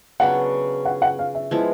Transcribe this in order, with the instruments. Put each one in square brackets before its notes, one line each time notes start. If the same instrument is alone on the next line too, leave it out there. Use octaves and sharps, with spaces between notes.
[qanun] C#3 F#3 B3 D4 [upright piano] F#5
[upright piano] F#5
F#5
F5
E5
[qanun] F3 G#3 B3 E4